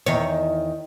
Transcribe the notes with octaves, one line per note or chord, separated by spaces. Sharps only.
E2 D#3 C#5